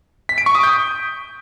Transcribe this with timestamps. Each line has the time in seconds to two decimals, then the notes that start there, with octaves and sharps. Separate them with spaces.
0.29 B6
0.38 D7
0.46 C#6
0.55 D#6
0.63 G6